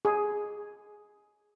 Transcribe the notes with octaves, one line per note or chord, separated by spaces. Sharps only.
G#4